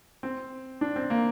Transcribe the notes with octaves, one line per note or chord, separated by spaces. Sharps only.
C4
D4
C4
A#3